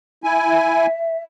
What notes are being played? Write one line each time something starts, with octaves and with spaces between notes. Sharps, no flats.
E4 G#5
E5